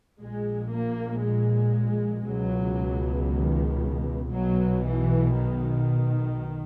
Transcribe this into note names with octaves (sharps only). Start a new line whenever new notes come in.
A#1 A#2 G#3
A#3
G#3
C#2 B2 F#3
D#3
B1 B2 F#3
E3
D#3